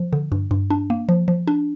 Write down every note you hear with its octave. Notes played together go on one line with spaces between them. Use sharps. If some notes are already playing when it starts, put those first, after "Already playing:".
Already playing: F3
D3
G2
G2
D4
A#3
F3
F3
D4